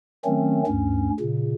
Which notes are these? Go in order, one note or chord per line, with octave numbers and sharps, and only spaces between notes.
D#3 F#3 A3 C4 C#4
D2 G2 C#4
A#2 C#3